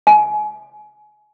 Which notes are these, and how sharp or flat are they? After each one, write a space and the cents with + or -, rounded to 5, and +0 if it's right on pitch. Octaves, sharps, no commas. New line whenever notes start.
G#5 +25